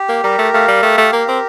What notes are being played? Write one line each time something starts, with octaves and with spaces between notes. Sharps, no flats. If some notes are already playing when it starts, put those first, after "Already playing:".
Already playing: G4
A#3
G3 A#4
A3
A3 F5
G3
A3 G4
A3
A#3 A#4
C4